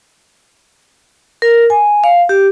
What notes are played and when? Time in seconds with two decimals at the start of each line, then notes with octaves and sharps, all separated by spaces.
1.42 A#4
1.70 G#5
2.04 F5
2.29 G4